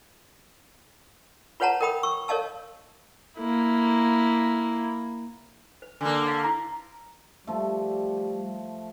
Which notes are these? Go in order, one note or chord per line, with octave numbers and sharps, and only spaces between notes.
F4 B4 C#5 F#5 A5 A#5
A#4 D#5 G5 B5 D#6
C#6 E6
A#4 C#5 D#5 F5 A5 E6
A#3 E4
B4
D3 A#3 G#5
B4 D#5 F5
E4 A#5
F3 G3 A3